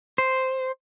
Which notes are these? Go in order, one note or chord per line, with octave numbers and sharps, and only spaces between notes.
C5